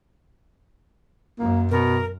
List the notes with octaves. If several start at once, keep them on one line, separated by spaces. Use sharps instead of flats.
F#2 A#3
B2 A#4